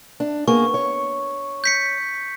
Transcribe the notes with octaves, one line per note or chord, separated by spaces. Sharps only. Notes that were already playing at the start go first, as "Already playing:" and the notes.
D4
A#3 B3 G#4 C#6
C#5
G6 B6 C#7